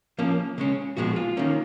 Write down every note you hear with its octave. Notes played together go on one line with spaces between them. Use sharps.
F3 A#3 C#4
C#3 G#3 C#4
A#2 F3 G#3 B3 F#4
F4
D#3 A#3 C#4